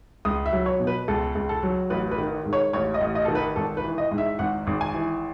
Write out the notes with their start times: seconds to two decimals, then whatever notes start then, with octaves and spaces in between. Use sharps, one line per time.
0.25 C#2 D#6
0.46 E5
0.52 F#3
0.66 C#5
0.80 B2
0.87 B4
1.08 C#2 A4
1.35 C#2
1.49 A4
1.63 F#3
1.90 A1 B4
2.11 B4
2.18 D#3
2.46 G#2
2.53 C#5
2.73 A1 C#5
2.94 D#5
3.01 A1
3.15 D#5
3.25 D#3 A4
3.35 B4
3.56 G#1 A4
3.77 B4
3.84 E3
3.98 D#5
4.12 G#2
4.18 E5
4.39 G#1 F#5
4.67 G#1
4.81 G#5
4.94 E3